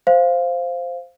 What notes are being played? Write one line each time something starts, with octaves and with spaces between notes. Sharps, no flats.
C5 F5